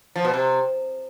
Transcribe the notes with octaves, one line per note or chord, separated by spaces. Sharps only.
F3
B2
C3